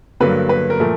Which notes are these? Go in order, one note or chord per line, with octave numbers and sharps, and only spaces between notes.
G2 D3 F#3 A#3 B4
B4
A#4
A#2 F3 A3